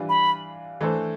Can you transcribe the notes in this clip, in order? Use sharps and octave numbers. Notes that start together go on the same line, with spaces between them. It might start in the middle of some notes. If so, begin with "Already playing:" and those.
Already playing: E3 G3 D4 F4
B5
E3 A3 D4 A4 C5